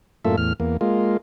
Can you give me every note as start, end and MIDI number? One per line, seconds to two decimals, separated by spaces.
0.25 0.36 42
0.25 0.36 45
0.25 0.36 58
0.25 0.36 65
0.25 0.36 69
0.25 0.36 76
0.37 0.53 40
0.37 0.53 45
0.37 0.53 89
0.60 0.77 40
0.60 0.77 58
0.81 1.17 56
0.81 1.17 58
0.81 1.17 65